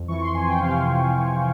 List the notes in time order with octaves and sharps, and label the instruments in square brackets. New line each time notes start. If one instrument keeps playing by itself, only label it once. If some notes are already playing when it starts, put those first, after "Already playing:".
Already playing: [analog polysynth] F2
E3 C#6
C6
F2 G#5
G5
C3 F5
C6
F2
E3